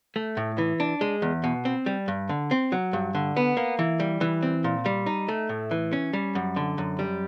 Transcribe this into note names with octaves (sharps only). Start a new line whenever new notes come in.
A3
A2
E3
D4
G#3
E2
B2
C4
G3
G2
D3
C4
F#3
G2
D3
B3
A#3
E3
G3
E3
C4
A#2
G3
D#4
A3
A2
E3
C#4
G3
F#2
D3
F#2
G3